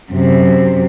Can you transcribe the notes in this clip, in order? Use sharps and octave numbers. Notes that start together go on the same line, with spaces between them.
F#2 C3